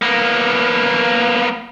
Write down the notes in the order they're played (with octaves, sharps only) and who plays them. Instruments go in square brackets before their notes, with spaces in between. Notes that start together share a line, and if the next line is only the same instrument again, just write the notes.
[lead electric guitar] A#3 B3